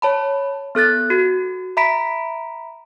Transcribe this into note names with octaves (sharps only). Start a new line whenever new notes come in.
C#5 A5 B5
B3 A4 F#6 A6
F#4
E5 A#5 B5 B6 D7